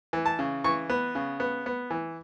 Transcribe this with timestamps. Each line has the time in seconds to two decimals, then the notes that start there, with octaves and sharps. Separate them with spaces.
0.13 E3
0.26 A5
0.39 C#3
0.64 E3 C#6
0.90 B3
1.15 C#3
1.40 B3
1.66 B3
1.90 E3